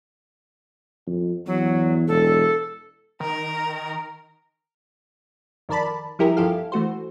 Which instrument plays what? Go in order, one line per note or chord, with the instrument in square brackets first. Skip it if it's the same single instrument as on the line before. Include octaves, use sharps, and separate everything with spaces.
[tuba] F2
[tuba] E2 [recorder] F#3
[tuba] E1 [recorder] A4
[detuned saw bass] D#3 [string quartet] A#4
[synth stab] F2 D#3 A#4 D5 A5 B5
F3 G3 E4 G4 G#4 A#4
G1 F3 E4 G4 A4 F5
E3 A3 F#4 C5